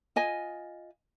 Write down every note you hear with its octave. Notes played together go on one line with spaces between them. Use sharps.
F4 D#5 G#5